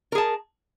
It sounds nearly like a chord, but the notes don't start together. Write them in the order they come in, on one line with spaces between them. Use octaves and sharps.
A#4 G#4 A5